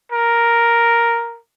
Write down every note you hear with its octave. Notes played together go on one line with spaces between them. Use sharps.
A#4